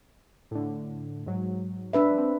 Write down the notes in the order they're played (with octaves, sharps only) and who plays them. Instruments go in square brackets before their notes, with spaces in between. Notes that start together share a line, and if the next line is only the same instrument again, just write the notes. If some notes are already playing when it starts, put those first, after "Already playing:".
[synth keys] A2 D3
G#2 F#3
[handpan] D4 B4 E5
[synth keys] C4